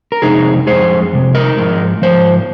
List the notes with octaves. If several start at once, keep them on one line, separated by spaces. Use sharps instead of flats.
A#4
F2 C3 G#3 D#4 G#4
F2 C3 G#3 G#4 C5
F2 C3 G#3
A#4 D#5
G#2 F3 G#3
G#2 F3 C5